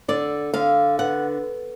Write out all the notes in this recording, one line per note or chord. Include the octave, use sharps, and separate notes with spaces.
D3 D5
D3 F5
B3 F#5